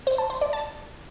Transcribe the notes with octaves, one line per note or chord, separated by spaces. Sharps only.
C5
A5
C5
D5
A5